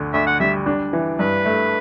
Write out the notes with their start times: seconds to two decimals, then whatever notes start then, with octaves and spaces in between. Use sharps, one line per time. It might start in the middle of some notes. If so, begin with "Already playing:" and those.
Already playing: D2 D3
0.13 D2 E5
0.27 F#5
0.40 G3 E5
0.66 D4
0.93 E3
1.19 G2 B4
1.45 A3